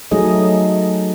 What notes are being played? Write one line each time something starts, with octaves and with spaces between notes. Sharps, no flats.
F#3 A3 D#4 G#4 D#5